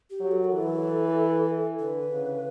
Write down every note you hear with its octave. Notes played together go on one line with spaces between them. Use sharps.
G4
F#3
A4
A#4
E3 A4
D3 B4
C#3